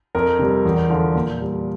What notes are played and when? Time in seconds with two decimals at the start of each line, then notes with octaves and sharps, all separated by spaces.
0.15 F2 A#4
0.39 C3 G3
0.65 E2
0.90 D3 F3
1.15 A#2
1.40 G3